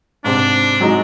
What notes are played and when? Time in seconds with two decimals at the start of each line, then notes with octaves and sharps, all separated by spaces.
0.24 G#2 C3 C4 D4
0.81 F#3 G#3 D#4